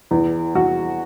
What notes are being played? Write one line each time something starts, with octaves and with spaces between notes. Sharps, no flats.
E2
E2 F#4